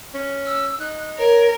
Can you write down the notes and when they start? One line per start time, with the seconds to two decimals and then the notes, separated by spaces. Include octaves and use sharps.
0.14 C#4
0.46 E6
0.80 D#4 F#6
1.18 A#4 C#5